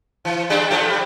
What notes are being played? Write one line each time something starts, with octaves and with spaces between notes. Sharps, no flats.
E3
G3 G#3 D4
F3 A3
G3